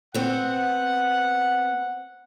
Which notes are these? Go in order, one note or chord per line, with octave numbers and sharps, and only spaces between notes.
B3 C4 F#5